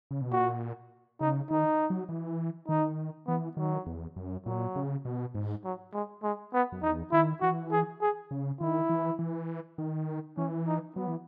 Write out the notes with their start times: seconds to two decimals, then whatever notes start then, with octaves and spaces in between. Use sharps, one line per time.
0.11 C#3
0.21 B2
0.31 A#2 F#4
1.21 C#3 D#4
1.51 D#3 D#4
1.90 F#3
2.09 E3
2.68 D#3 D#4
3.27 E3 B3
3.57 D#3 F#3
3.86 E2
4.16 F#2
4.46 A#2 F#3
4.76 C#3
5.05 B2
5.35 G#2
5.64 F#3
5.93 G#3
6.23 G#3
6.53 B3
6.72 F#2
6.82 E2 D#4
7.12 D#3 E4
7.41 E3 F#4
7.71 G#4
8.01 G#4
8.31 C#3
8.61 D#3 E4
8.90 E3
9.19 E3
9.78 D#3
10.37 E3 C#4
10.67 D#4
10.96 F#3 B3
11.07 E3